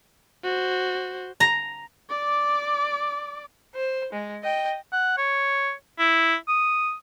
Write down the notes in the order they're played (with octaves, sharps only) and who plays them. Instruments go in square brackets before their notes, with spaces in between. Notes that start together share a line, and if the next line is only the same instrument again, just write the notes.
[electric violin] F#4 C5
[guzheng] A#5
[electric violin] D5 D6
[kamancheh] C5
G#3
D#5 G5
[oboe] F#5
C#5
E4
D#6